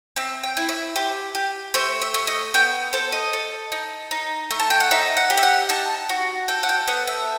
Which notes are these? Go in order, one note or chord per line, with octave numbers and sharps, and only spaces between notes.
C4 E5
G5
E4
E5
G4 C5
G4
A3 C5
E5
A3
D#5
B3 G5
A4 C5
D#5
A4
D#4
D#4
A3
A5
G5
F#5
D#4 E5
F#5
G4
E5
F#5
D#4 A5
F#4
A4 G5
F#5
G5
B3 F#5
E5